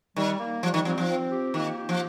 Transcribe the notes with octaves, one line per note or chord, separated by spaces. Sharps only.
D#3 G3
A#3
F3 G3
D#3
F3 C4
F3
C4
G4
D#3 A#3
G4
F3